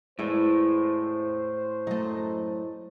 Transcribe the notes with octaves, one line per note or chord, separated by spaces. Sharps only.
E2 A2 E3 G#3 C5 E5
F#2 F#3 A3 D#5